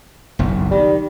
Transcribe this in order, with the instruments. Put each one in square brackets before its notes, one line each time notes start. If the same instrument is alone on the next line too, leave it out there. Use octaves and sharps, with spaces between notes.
[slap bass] F#1 B1 E2
[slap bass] D#3 [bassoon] G3